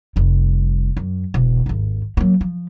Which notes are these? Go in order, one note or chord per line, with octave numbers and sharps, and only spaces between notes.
F1 G3
F#2
E1
G#1 D#2
F#3 A#3
F3